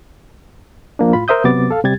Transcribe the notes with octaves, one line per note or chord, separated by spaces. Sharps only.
F3 A#3 D4
A2 F4 B5
A#4 C5 E5 D#6 G6
C3 F#3 B3 D6 A6
A4 F5
C3 G3 G4 G#6 A6